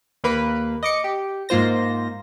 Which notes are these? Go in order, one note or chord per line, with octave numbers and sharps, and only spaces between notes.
D#2 A#3 B4 B5
D#5 D6 C#7
G4
G#2 A#3 F4 C5 A#6